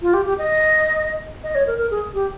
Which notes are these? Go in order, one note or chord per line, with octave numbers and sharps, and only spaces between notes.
F4
G4
G4
D#5
D#5
C#5
A#4
A#4
G#4
G4